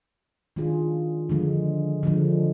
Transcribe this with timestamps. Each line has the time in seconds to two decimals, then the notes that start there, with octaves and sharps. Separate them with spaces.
0.56 D#3 G#3 D4 F4 G#4
1.29 D3 F3 G#3
2.03 D3 F3 G#3